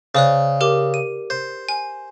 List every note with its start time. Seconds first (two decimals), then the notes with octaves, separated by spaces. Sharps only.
0.15 C#3 C5 D5 F#6
0.61 G4 A#4 D6
0.94 D#7
1.30 C5
1.69 G#5